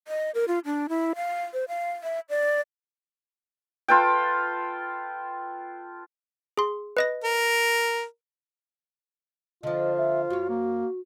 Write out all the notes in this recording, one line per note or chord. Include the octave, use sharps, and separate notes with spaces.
D#5
A#4
F4
D4
E4
F5
C5
F5
E5
D5
F4 A4 B4 G5
G#4 C6
B4 D#5 A#6
A#4
D3 F3 F4 D#5
E5
F#2 F#4 C#5
A#3